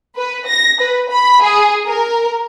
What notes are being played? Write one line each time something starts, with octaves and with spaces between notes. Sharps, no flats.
B4
A#6
B4
B5
G#4
A#4